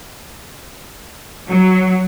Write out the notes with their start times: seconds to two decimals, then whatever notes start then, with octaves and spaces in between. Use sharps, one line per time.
1.48 F#3